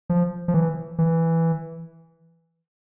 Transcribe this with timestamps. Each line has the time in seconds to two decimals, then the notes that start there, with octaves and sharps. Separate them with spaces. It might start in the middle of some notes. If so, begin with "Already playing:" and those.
0.10 F3
0.48 F3
0.54 E3
0.98 E3